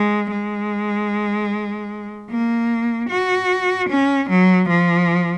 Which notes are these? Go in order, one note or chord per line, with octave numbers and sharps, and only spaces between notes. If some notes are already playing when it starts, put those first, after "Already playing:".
Already playing: G#3
G#3
A#3
F#4
C#4
F#3
F3